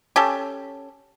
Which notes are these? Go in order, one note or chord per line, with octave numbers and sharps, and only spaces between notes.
C#4 G4 A4